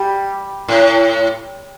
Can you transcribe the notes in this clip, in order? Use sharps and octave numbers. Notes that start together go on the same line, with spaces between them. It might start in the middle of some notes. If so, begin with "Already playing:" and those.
Already playing: G3
A2